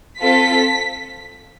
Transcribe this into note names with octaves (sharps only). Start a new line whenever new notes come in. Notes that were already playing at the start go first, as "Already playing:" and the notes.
C4 F4 A4 B6